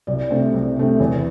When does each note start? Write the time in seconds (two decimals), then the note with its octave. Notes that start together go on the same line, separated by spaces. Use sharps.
0.07 C2 D5
0.30 C3 A3 C4
0.54 C2
0.77 C3 A3 C4
1.00 E2